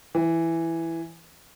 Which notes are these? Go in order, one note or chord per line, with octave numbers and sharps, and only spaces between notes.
E3